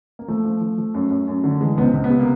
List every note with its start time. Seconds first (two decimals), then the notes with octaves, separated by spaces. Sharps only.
0.19 A#3
0.28 F3 A3
0.45 F3
0.61 F3
0.78 F3
0.94 F#2
1.10 F#2
1.28 F#2
1.44 D3
1.61 E3 G#3
1.77 C#2 B3
1.82 C4
1.93 C#2
2.04 B3
2.10 C3
2.20 A#3